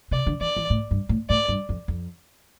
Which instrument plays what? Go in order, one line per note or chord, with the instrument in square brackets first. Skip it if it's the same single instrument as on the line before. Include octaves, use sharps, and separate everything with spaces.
[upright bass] C3 [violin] D5
[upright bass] D3
[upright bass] E3 [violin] D5
[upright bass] E3
A2
G2
A2
[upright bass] A2 [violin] D5
[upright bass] G2
F2
F2